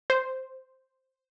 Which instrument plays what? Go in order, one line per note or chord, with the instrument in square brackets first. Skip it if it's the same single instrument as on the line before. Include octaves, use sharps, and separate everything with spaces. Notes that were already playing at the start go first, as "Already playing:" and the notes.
[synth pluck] C5